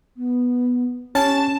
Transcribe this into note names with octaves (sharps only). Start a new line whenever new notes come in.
B3
C#4 G4 A5